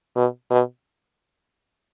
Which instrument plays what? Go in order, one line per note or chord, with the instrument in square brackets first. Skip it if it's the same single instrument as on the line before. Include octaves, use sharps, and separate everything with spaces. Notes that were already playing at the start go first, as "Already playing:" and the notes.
[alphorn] B2
B2